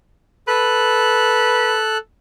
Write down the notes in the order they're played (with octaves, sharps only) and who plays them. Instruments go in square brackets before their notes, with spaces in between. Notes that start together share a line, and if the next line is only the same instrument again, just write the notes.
[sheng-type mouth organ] A4 F#6 [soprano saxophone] B4